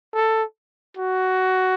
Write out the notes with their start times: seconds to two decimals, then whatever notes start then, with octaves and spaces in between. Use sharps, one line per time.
0.14 A4
0.97 F#4